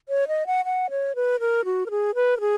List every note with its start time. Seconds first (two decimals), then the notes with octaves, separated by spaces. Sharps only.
0.09 C#5
0.28 D#5
0.47 F#5
0.65 F#5
0.90 C#5
1.15 B4
1.40 A#4
1.65 F#4
1.86 A#4
1.91 G#4
2.15 B4
2.37 A#4
2.40 G#4